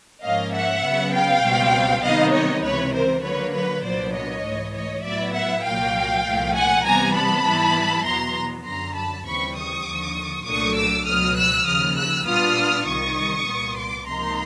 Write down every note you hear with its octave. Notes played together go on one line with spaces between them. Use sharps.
G#2 F3 A#3 C#4 D#5 F5
E5 F#5
C#3 F#3 B3
F5 G5
C#2 B2 G3 C4
C3 D#3 G3 B3 D#4 D#5 F5
C#5 D#5
C#2 C3 E3 B4 C#5
A#4 C5
D3 F#3 A#3 B4 C#5
B4 C#5
C2 A#2 F#3 B3 D4 C5 D5
C#5 D#5
G#2 E3 A3
C#5 D#5
A2 F#3 B3 E4 D5 E5
E5 F#5
C2 A#2 F#3 A#3 F5 G5
C2 A#2 F3 A3
F#5 G#5
C3 E3 G3 B3 G#5 A#5
A5 B5
G#2 E3 G3 B3 E4
E2 B2 F#3 B3 A#5 C6
F#2 D3 F#3 A#5 C6
A5 B5
D#2 C#3 E3 G3 C4 B5 C#6
C#6 D#6
D#2 D3 F3
C2 A#2 F#3 A3 D4 C#6 D#6
D6 E6
C#2 B2 F#3 D#6 F6
E6 F#6
D#2 C#3 F3 D#6 F6
E6 F#6
A#2 G3 B3 D4 F4 D#6 F6
C2 C3 D#3 G3 C#6 D#6
C2 A#2 G3 B3
C6 D6
C#2 C3 F3 A#3 D#4 A#5 C6